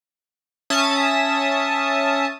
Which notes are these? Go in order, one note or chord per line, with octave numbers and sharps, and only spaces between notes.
C#4 E5 A5 D#6